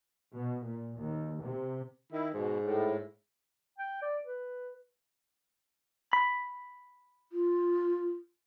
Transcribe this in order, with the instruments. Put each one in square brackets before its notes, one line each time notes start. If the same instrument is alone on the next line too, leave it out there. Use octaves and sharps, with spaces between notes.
[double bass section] B2
A#2
D#2
C3
[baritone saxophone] D#3 [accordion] E4
[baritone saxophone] G#2 [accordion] B2
[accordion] A2
[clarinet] G5
D5
B4
[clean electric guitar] B5
[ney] F4